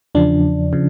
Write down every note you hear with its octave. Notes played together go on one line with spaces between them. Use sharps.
E2 C#3 F3 D4
C#3 F3